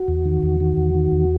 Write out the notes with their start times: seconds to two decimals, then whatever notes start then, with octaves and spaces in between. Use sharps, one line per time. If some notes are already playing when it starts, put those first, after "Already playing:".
Already playing: F#4
0.08 E2
0.25 D#3
0.43 E2
0.60 D#3
0.77 E2
0.95 D#3
1.12 E2